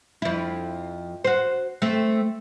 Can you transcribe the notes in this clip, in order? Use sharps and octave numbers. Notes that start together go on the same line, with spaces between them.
F2 E4
F#4 C5
A3 C4